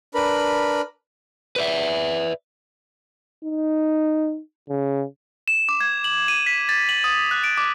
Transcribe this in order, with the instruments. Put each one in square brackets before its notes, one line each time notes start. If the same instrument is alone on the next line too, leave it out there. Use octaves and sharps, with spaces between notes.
[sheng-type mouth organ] D4 A#4 B4 B5
[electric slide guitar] B4 D5 E5
[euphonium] D#4
C#3
[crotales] E7
D6
G#6
F#7
D#7
B6
A6
F#7
D#6
F#6
D7
D6